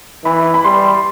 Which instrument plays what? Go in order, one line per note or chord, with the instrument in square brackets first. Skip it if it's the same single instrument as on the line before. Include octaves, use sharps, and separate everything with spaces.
[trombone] E3 [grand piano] B5
[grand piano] B5
[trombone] G3 [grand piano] C6